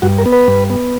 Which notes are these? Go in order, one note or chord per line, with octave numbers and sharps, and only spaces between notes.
G2 F#4
A#4
B3
B4
G2
B3